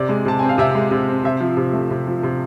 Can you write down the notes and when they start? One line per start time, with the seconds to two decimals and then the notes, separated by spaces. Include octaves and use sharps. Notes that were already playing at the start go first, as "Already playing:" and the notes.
Already playing: C3 D5
0.09 G#3
0.25 C3 A5
0.39 C4 G#5
0.49 F5
0.58 C3 E5
0.75 G#3
0.91 C3
1.09 C4
1.24 C3 E5
1.41 F3
1.57 C3
1.74 A3
1.90 C3
2.07 F3
2.23 C3